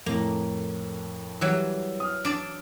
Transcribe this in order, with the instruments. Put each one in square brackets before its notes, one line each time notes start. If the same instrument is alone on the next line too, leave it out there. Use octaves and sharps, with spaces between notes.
[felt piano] F2 A2 [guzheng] A#3
[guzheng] E3 F#3 [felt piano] G3 E6
[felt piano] D#6 F6
[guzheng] D4 D5 A5